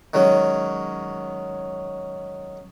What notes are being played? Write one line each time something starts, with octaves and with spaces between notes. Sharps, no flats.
D#3 F#3 G#3 C#4